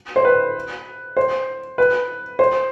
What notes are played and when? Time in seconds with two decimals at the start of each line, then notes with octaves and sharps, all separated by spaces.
0.16 C5
0.25 B4
1.17 C5
1.78 B4
2.39 C5